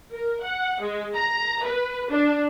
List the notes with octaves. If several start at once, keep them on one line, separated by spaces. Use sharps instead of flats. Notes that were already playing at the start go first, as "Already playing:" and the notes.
A#4
F#5
G#3
A#5
B4
D4